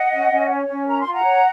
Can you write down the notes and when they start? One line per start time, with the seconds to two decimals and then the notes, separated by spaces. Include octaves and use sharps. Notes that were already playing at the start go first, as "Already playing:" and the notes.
Already playing: D#5 F#5
0.12 C#4
0.31 C#4
0.50 C#5
0.67 C#4
0.86 A#4 A#5
1.00 F4 C6
1.12 F#5 A#5
1.23 C#5